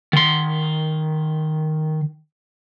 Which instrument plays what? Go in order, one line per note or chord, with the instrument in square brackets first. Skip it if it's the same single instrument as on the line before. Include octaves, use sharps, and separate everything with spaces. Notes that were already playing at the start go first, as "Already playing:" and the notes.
[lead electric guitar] D#3 C6